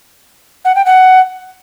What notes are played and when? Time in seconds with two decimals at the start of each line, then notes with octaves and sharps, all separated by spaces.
0.65 F#5
0.75 G5
0.86 F#5